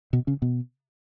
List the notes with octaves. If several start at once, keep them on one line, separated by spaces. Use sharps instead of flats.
B2 B3
C#3 C#4
B2 B3